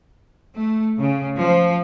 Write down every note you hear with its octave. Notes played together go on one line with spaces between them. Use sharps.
A3
C#3
F3